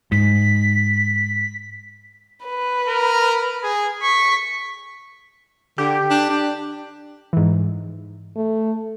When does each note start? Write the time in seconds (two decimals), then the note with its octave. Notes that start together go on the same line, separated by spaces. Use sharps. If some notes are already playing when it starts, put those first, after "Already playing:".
0.12 G#2 B6
2.46 B4
2.88 A#4
3.63 G#4
4.02 C#6 B6
5.78 D3 G4
6.10 D4
6.30 D4
7.33 G#2 E3
8.36 A3